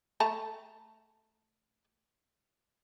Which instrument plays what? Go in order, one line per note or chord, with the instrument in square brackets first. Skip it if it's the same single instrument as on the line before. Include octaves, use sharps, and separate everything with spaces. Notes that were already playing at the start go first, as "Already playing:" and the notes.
[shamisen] A3 A5 A#5